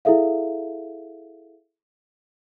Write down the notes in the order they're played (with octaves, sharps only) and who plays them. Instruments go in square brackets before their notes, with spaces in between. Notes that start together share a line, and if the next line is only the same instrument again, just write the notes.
[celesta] E4 G#4 A4 E5 F5